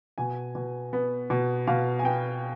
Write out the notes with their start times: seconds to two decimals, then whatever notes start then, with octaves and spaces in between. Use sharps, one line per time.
0.18 B2 G#5
0.55 B2
0.93 B3
1.30 B2
1.67 B2 F5
1.99 G#5
2.04 B3 G5